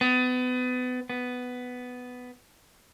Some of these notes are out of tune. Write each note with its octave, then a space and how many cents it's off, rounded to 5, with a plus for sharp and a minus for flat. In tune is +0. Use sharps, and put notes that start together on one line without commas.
B3 +30
B3 +10